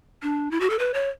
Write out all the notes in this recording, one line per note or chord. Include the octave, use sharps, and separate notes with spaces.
D4
E4
F#4
A4
B4
C#5